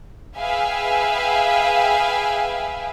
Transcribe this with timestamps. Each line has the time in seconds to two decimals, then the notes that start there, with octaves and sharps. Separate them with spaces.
0.38 G#4 B4 E5 F5 G5 G#5